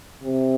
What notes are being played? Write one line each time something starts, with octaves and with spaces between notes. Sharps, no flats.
C3